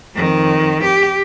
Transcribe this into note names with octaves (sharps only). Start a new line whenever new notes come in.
F2 D#3
G4